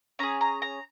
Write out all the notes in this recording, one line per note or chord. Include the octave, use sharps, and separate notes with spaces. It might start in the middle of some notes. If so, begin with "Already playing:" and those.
C#4 G#4 A#5
A#5
A#5